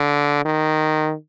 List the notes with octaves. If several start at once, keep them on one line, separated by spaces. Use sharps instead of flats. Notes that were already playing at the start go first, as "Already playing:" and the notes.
Already playing: D3
D#3